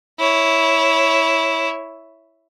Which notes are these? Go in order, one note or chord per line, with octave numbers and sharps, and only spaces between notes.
E4 C#5